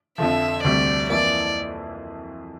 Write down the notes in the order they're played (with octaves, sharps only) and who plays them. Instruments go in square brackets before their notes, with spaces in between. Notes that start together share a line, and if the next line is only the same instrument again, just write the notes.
[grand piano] F2 D3 F3 [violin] E5
[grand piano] D2 C3 G3 [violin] D5
[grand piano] F2 E3 A#3 E4 [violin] D5